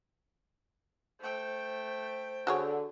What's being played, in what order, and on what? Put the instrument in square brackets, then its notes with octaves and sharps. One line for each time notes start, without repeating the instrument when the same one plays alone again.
[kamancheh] A3 G5 [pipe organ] C5
[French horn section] D3 [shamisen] F#4 G#4 C#5